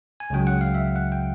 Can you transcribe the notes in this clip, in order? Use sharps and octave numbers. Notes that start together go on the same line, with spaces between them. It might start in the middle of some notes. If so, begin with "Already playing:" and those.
G#5
C#2 C#3 F#3 G5
F#5
F5
E5
F#5
G5